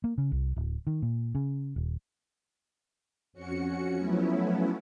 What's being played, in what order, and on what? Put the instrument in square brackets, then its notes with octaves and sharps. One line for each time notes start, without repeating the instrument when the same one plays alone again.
[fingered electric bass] A#3
C#3
C2
D1
D#3
A#2
C#3
D#1
[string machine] F2 C#4 F#4 C#7
F3 F#3 A3 B3 C#4 E4